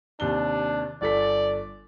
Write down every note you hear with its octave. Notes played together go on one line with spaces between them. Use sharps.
D#2 C3 D4 G7
G1 A4 D5 B6